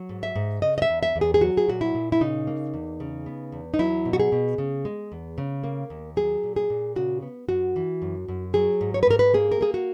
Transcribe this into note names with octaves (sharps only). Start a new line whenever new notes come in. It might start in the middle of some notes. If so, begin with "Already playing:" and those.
Already playing: F#3
G#2
E5
G#2
C#3 D#5
D#5
E5
E2
E5
E2
G#4
G#4
F#3 F#4
G#4
A#2 F#4
E4
A#2
E4
C#3 D#4
A#3
E2
C#3
B3
E2
D#4
F#3 E4
B2
F#4
G#4
B2
C#3
G#3
E2
C#3
A#3
D#2
F#3 G#4
A#2
G#4
A#2
C#3 F#4
B3
F#2 F#4
E3
F#2
F#2
F#3 G#4
G#2
C#5
B4
G#2 A#4
B4
A#3 G#4
A#4
A#3 G#4
F#4